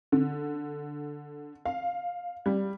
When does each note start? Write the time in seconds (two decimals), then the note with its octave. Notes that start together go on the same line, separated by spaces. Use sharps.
0.12 D3
1.66 F5
2.46 G3